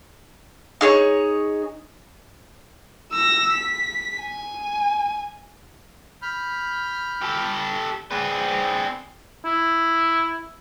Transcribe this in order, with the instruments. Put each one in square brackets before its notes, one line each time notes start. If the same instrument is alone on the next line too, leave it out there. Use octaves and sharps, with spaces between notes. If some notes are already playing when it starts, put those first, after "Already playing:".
[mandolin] D#4 G#4 C#5
[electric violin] E6 A#6
B6
G#5
[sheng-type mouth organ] B5 F6 G6
[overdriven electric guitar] G4 A4
[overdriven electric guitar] C4 B4 [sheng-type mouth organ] G#4 D5
[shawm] E4